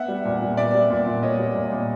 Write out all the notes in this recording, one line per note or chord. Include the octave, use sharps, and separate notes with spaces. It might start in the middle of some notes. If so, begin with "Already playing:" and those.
Already playing: B3 E5 F#5
G3
A#2
A#2
B3 D5 E5
G3
A#2
A#2
B3 C#5 D#5
G3
A#2
A#2